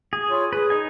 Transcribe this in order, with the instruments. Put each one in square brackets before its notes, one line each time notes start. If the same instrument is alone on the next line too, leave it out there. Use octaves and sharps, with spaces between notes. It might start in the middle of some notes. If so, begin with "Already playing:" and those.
[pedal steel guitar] G#4
[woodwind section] E4 F4 C#5
[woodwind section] G#4 [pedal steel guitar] B4
[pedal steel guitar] D#4 G#5